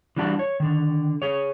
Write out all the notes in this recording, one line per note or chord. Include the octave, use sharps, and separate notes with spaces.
E3 G3 D4 F#4 A5
C#5
D3 D#3
G#4 C#5